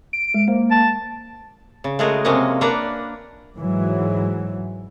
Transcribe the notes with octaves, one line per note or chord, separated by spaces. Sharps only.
D7
G#3
A#3 C5
A5
C#3
G#3 A3 F4 F#4 G#4 A#4
C3 F3 G#3 A#3 C#4 D#5
A#3 D4 B4 F#5 A#5
G#2 E3 F#3